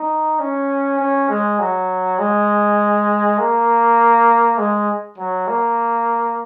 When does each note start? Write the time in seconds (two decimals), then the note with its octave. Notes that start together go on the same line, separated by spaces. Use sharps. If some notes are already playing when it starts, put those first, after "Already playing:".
Already playing: D#4
0.40 C#4
0.99 C#4
1.29 G#3
1.59 F#3
2.19 G#3
3.38 A#3
4.58 G#3
5.18 F#3
5.48 A#3